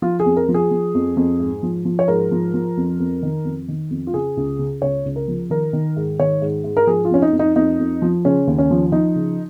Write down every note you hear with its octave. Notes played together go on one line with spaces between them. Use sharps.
F3 F4
G#4
F2
A#4
F3
G#4
F3
F2
F2
G#2
F3
F3
C#5
G#2 A#4
F3
F3
F2
F2
D#3
F2
D#3
F2
F4
C#3 G#4
C#2
C#3
C#2 C#5
C#2
A#4
F3
D#3 A#4
D#3
G#2
D#3 C#5
G#2
G#2
A#4
F3 G#4
F4
F2 C#4
D#4
F2
D#4
F2 D#4
F2
F3
C#3 C#4
D#2
C#4
F3
F3 D#4
C#3